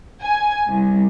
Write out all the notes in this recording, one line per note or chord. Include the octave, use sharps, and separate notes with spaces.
G#5
C2